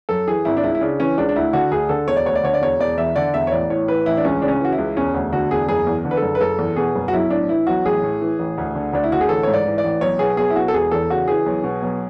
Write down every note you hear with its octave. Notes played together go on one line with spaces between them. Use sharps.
F#2 A4
E3 G#4
G#1 E4
D4
C#2 E4
E4
C#3 D4
E3 C#4
C#2 D4
D4
D2 E4
D3 F#4
D2 G#4
D3 A4
E1 C#5
D5
D2 C#5
D5
D3 C#5
D5
E1 C#5
E1 D5
E2 E5
D3 D5
E1 E5
C#5
A1 D5
A2 C#5
E3 B4
A1 E4
D4
C#2 C#4
C#3 D4
C#4
E3 F#4
E4
C#2
E1 C#4
D2
D3 F#4
E1 G#4
F#1 G#4
E2
D3
B4
A4
F#1
B4
F#1 A4
E2
B2 G#4
F#1
F#4
B1 E4
A2 D4
E3 E4
B1 F#4
A1 G#4
A2
E3
A1
D2
D3
D2 D4
E4
D3 F#4
G#4
A1 A4
G#2 C#5
D5
E3
D5
A1
B1 C#5
B2 G#4
B1 G#4
E4
B2 F#4
A4
E1 G#4
E2 A4
C#3 F#4
E3 G#4
B1
B2
B1